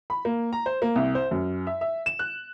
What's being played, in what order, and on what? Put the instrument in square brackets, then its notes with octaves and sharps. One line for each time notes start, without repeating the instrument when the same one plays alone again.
[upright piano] B5
A#3
A#5
C5
A#3
C2
C5
F#2
E5
E5
E7
F#6